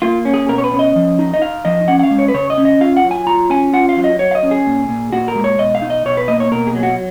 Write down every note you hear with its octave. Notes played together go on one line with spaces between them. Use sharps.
A#3 F4
C#4
G#4
B2 A#4
C#5
B4
C#4
D#5
F3
D#4
D#5
D#4 F5
F3 D#5
C#4 F#5
F#5
F5
G#3
C#5
B4
C#3 C#5
D#5
C#4
D#5
F4 F5
F#5
F#3
G#5
F4 A#5
C#4 G#5
F4 F#5
F5
F#3
D#5
F#3 C#5
F5
D#5
C#4
G#4
A#2
A#2
A#2 F#4
A#4
G#3
C#5
B2 D#5
F5
D#4
D#5
B2 C#5
B4
A#3 D#5
C#5
B2 A#4
G#4
F#3
F#4